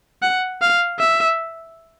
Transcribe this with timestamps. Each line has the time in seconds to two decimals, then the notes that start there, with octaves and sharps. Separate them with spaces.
0.22 F#5
0.62 F5
1.00 E5